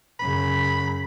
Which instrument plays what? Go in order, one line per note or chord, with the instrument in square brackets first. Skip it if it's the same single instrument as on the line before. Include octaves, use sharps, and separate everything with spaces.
[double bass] F#2 C#3 [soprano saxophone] B5